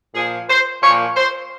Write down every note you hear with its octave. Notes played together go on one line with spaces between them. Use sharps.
A#2 F3 G#4
C5
A#2 F3 C#5
C5